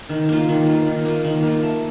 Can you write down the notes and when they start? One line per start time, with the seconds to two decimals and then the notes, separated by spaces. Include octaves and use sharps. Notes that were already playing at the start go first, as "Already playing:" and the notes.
0.09 D#3
0.29 A#3 F4
0.49 D#3
0.66 A#3 F4
0.87 D#3
1.05 A#3 F4
1.25 D#3
1.43 A#3 F4
1.63 A3